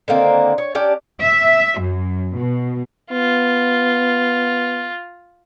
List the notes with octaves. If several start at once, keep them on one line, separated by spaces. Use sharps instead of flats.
D3 D#3 A#3 C4
C#5
C#4 D4 G4 D5
E5
F#2
B2
B3 F4